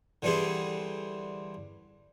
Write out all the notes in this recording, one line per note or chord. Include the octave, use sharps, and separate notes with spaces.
D3 E3 G3 C4 G#4